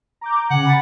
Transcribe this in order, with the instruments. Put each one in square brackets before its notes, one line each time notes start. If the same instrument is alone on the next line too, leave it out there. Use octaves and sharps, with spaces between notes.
[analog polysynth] A#5 D6 G6
[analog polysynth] C#3 G#5 [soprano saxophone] F#5
[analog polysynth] B5 A6